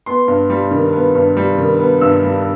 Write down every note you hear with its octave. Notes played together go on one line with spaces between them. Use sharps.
B3 C6
G2
G3
D#3
B3
G2
G3
D#3
B3
G2 E6
G3